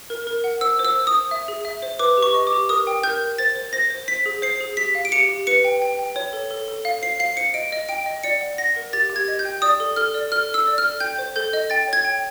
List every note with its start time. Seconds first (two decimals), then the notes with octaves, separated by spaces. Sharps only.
0.10 A#4
0.27 A#4
0.44 F#5
0.61 C5 E6
0.79 C5
0.85 E6
0.96 C5
1.07 D#6
1.13 C5
1.31 E5
1.48 G#4
1.65 E5
1.82 C5
1.99 B4 D6
2.17 G4
2.23 C#6
2.34 D#5
2.47 D6
2.53 G4
2.69 A#4 D#6
2.87 G5
3.03 A#4 G6
3.21 A#4
3.38 C5 A6
3.56 C5
3.73 C5 A#6
3.90 C5
4.08 C5 B6
4.26 G#4
4.42 C5 C7
4.61 G#4
4.77 G4 B6
4.95 F5
5.05 D7
5.12 G4 C#7
5.29 G4
5.47 B4 C#7
5.64 G5
5.82 G5
5.99 G5
6.16 C#5
6.33 A4
6.51 A4
6.68 A4
6.85 F5
7.02 C5 C7
7.20 F5 C7
7.37 C5 C#7
7.54 D#5 D7
7.72 D#5
7.89 G5 D7
8.06 D#5
8.24 D5 C#7
8.41 F#5
8.58 F#5 A#6
8.76 A#4
8.93 G4 A6
9.10 G4
9.16 G#6
9.28 D#5
9.39 G6
9.45 G5
9.62 D5 D#6
9.80 A4
9.96 A4 F6
10.14 D5
10.32 A4 F6
10.49 A4
10.54 E6
10.67 D5
10.78 F6
10.84 A4
11.00 G5 G6
11.18 C5
11.36 A4 G6
11.53 D#5
11.70 G5 A6
11.88 C#5
11.93 G#6
12.05 G5